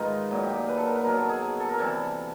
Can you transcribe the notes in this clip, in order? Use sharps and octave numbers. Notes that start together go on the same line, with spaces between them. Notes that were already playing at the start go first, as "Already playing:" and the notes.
Already playing: G#2 D#3 G#3 D#4 F4 G#4 B4
A#2 F#3
G4
G#4
B4
A4
A#4
B4
B2 F#3 A#4
A4
G#4
G#4
A4
A#4
C3 E3 G3 A4